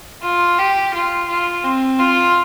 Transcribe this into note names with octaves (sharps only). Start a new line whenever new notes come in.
F4
G4
F4
F4
C4
F4